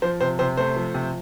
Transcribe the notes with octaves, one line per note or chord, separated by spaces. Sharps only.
F3 C5
C3 C5
C3 C5
A3 C5
F3
C3